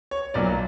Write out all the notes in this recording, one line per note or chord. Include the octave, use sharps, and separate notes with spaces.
C#5
B1 A#2 F#3 D5